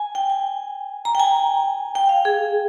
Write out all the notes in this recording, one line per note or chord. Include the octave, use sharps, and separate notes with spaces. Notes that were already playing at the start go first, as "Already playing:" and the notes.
Already playing: G#5
G5
G#5
A#5
G5
G#5
G5
F5
G#4